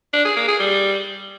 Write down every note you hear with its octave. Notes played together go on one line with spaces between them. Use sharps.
D4
G#4
A#3
G#4
G3